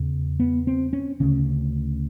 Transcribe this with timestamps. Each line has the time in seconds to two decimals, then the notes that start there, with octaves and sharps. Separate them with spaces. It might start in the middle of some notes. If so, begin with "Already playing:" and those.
Already playing: E2 C#3
0.40 B3
0.67 C4
0.93 C#4
1.20 D2 C#3 C#4